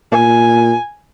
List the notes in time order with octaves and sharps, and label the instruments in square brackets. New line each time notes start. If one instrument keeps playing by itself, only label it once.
[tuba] A#2 [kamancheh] G#5